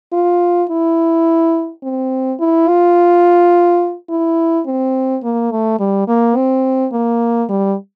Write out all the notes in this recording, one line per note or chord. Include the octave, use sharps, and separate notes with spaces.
F4
E4
C4
E4
F4
E4
C4
A#3
A3
G3
A#3
C4
A#3
G3